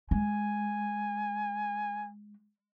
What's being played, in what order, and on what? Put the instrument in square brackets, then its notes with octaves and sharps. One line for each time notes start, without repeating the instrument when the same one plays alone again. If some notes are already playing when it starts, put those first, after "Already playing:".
[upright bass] G#3 [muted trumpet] G#5